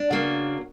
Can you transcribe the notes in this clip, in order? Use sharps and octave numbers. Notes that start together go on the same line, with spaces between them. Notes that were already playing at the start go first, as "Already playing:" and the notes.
Already playing: D4
C#3 F#3 A#3